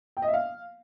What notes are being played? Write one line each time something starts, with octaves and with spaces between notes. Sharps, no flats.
G5
D#5
E5
F5